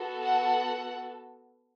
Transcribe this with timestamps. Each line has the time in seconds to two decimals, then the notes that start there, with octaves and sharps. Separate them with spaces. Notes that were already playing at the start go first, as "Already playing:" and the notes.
Already playing: B3 F#4 A4
0.22 F#5